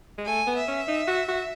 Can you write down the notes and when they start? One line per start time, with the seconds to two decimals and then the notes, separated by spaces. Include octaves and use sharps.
0.18 G#3
0.26 A3 G#5
0.47 B3
0.57 E5
0.67 C#4
0.88 D#4
1.07 F#4
1.28 F#4